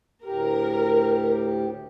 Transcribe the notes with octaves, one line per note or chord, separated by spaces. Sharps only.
D2 A2 G4 A#4